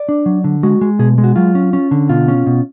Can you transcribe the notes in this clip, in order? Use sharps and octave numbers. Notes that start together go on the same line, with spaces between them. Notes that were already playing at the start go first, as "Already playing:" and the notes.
Already playing: D5
D4
F#3
D3
G#3 F#4
G#3
B2 G#4
G#3
F#4
F#3 F4
C#4
C#4
D3
B2 F4
C#4
B2